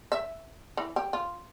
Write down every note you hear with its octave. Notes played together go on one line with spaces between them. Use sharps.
E5
E3
G4
F4